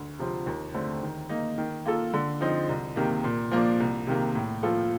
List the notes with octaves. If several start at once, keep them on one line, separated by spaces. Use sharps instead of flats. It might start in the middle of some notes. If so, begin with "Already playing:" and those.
Already playing: D2
C3 F3 C4
D#2
D3 A3 C4
D#3
A#3 D#4
D#3
A#3 F4 A4
D3
F3 C4 D#4
C2
C3 D#3 A#3
A#2
F3 A#3 D4
C2
C3 D#3 A#3
A2
F3 A#3 F4 A4